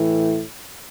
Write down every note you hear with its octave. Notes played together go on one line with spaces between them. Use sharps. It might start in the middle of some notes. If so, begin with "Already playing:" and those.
Already playing: A2 E3